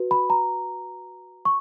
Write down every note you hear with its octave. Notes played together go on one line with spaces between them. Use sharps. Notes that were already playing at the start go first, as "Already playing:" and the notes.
Already playing: F#4 B4
B5
A#5
C#6